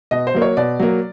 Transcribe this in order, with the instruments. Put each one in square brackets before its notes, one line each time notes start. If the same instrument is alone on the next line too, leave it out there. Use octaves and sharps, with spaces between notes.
[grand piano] B2 D#5
C5
F#3 A#3
C#5
B2 D5
F#3 A#3